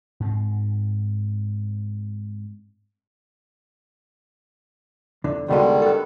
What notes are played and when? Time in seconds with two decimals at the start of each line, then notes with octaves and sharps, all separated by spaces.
0.20 G#2 C4
5.24 E2 D3
5.48 C#2 B2 D3 D#3 G3 G#3
5.82 A4 B4